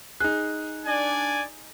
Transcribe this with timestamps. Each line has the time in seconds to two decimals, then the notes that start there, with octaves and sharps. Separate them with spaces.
0.20 D#4 G#4 F#6
0.86 D4 D5 G#5